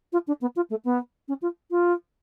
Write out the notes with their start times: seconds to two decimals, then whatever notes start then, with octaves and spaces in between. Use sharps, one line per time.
0.12 F4
0.27 D4
0.41 B3
0.56 F4
0.70 A3
0.84 B3
1.28 C#4
1.41 F4
1.70 F4